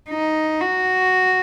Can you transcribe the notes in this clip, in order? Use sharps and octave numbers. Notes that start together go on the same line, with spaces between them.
D#4
F#4